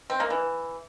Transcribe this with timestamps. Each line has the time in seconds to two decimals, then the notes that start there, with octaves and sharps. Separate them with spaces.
0.10 C4
0.20 A#3
0.30 E3